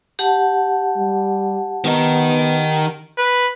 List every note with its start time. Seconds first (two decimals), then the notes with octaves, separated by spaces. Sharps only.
0.19 G4 F#5 A5
0.96 G3
1.85 D#3 B3 D#4
3.18 B4